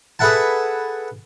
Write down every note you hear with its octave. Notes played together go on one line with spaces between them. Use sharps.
G#4 A4 B4 E5 F#5 A5